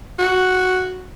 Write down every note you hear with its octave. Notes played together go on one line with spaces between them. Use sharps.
F#4